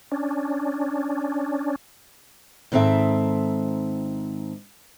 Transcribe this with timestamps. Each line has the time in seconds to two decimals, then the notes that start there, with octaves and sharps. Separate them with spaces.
0.12 C#4 D4
2.72 G#2 D#3 C4 A4 E5